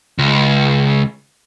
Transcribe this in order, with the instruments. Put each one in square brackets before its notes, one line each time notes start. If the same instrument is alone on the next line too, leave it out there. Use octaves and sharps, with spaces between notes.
[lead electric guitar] C#2